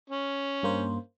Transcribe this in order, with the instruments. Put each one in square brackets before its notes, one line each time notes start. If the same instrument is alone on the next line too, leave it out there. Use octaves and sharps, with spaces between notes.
[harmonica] C#4
[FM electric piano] G2 A#3 C5